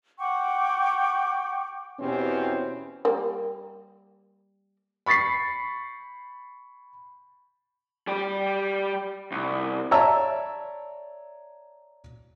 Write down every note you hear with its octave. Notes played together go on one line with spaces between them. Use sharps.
F#5 G5 C#6 D6
E2 B2 C4 C#4 G4 C5
G3 A#3
B5 C#6 A6 B6 C7
G3 G4
C2
C#5 D5 E5 A5 A#5 E6